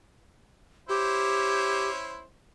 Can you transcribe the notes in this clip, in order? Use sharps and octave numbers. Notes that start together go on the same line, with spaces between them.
C#4 E4 G4 C5